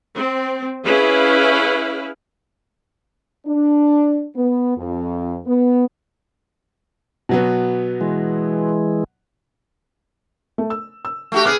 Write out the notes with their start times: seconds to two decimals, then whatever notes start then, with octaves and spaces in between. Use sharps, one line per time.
0.15 C4
0.85 C#4 E4 G#4 B4 F5
3.46 D4
4.35 B3
4.76 F2
5.46 B3
7.29 B2 F#3 B3
8.01 E3 G#3
10.58 A3
10.70 E6
11.05 E6
11.32 A3 F#4 G4
11.45 B3 G#4 D6 F6 F#6